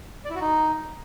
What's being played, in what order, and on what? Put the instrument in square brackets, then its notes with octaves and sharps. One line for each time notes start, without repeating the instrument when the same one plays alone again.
[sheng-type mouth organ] D5
E4
F#4
D#4